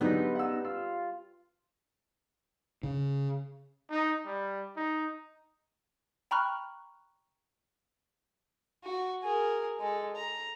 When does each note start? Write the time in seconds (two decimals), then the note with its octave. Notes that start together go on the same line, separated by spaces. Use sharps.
0.01 G#2 D3 F#3 G3 B3 C4 D#4 B4
0.35 F#5 E6
0.65 F4 E6
2.83 C#3
3.90 D#4
4.26 G3
4.77 D#4
6.31 G5 A#5 B5 C#6 F6 F#6
8.84 F#4
9.23 G#4 A#4
9.79 G#3 A4
10.16 A#5